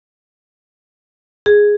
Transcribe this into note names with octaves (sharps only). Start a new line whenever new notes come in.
G#4